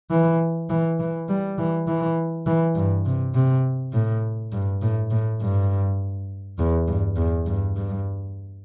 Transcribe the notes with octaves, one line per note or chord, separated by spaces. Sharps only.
E3
E3
E3
G3
E3
E3
E3
G2
C3
C3
A2
G2
A2
A2
G2
E2
G2
E2
G2
G2